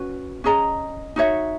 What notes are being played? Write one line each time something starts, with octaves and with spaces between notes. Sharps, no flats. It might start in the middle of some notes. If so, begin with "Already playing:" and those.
Already playing: C#4 F#4 B4
C#4 G#4 D#5 A#5
D#4 F#4 C#5 E5